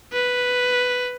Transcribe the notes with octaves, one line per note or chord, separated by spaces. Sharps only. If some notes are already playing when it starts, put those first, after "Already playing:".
B4